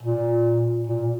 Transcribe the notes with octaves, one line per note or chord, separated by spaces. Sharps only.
A#2
A#2